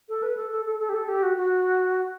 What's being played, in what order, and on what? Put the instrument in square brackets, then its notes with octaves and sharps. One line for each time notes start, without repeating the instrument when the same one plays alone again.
[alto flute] A4
B4
A4
A4
A4
A4
G4
A4
G4
F#4
F#4